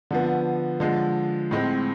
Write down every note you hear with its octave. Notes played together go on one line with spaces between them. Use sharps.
D3 F3 B3
D3 F3 G#3
A2 G#3 C4